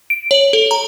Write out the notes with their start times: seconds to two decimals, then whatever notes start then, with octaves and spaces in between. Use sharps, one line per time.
0.10 D7
0.31 C#5
0.53 A4
0.71 A#5